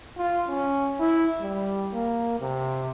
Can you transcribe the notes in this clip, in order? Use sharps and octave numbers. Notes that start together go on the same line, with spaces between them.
F4
C#4
E4
G3
A#3
C3